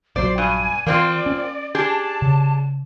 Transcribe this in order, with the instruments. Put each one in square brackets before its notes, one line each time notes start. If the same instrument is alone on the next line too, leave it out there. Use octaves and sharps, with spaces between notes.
[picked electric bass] A#1 A#2 F#3 [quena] C5 [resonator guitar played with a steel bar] D5
[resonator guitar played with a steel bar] G2 [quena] G#5
[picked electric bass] E3 [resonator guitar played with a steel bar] A#3 C4 F4 [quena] D5
[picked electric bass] C#4
[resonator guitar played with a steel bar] D4 G4 G#4 [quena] A5
[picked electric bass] C#3